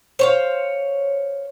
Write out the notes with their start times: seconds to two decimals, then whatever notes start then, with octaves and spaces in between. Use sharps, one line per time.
0.19 C5 C#5 F5